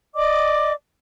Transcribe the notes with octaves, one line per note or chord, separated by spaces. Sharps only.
D5 D#5 D6